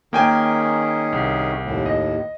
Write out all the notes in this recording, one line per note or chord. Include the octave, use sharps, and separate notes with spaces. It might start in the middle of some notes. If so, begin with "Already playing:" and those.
D#3 A#3 C#4 G#4 G5 G#5
C2
D#2 A2
D#5